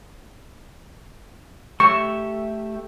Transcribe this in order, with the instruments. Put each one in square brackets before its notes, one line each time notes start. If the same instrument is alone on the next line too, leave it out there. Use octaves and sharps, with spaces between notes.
[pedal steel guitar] A3 G4 E5 [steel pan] C#6